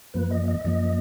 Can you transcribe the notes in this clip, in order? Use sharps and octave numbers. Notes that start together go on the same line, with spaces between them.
F#2 F3 A#3 B4
D#5
D#5
F#2 F3 A#3 D#5